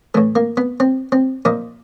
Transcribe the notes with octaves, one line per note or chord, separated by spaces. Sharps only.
A2 E3 A3
A#3
B3
C4
C4
A#2 F3 D#4